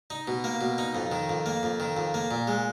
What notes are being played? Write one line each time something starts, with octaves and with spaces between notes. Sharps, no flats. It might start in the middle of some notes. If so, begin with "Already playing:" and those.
D#4
B2
A#3
B2
D#4
F2
D#3
F2
A#3
F2
D#3
F2
A#3
A#2
G#3